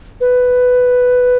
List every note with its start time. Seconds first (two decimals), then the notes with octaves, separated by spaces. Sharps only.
0.21 B4